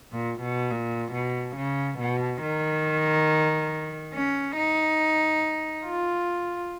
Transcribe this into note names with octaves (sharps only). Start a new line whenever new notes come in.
A#2
B2
A#2
B2
C#3
B2
D#3
C#4
D#4
F4